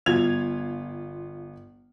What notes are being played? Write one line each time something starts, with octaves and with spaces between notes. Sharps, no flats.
G1 F4 G#6 F7